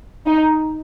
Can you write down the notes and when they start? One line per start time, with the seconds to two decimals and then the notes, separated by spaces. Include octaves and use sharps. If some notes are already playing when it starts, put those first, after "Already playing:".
0.26 D#4